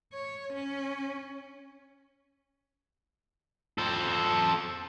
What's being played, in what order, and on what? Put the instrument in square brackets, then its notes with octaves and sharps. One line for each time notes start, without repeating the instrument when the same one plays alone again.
[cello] C#5
C#4
[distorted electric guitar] A4 C5